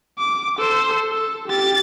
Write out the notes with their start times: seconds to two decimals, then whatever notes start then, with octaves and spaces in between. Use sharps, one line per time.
0.19 D6
0.59 A4 C5
1.13 A4
1.48 G4 A6